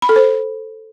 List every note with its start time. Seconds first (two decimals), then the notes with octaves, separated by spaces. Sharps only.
0.02 B5
0.09 A4
0.16 C5